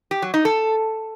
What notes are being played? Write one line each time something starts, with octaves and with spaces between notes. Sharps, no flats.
G4
F#3
D#4
A4